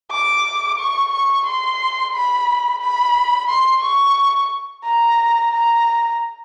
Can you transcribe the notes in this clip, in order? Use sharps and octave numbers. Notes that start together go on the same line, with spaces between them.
D6
C#6
C#6
C6
B5
B5
C6
C#6
A#5
A#5